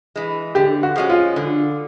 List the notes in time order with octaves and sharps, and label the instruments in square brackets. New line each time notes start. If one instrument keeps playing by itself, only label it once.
[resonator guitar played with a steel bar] E3 G#3
[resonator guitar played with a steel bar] D3 [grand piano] G4
[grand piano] F#4
[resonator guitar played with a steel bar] F3 G#3 C#4
[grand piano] F4
[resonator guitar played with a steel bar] D3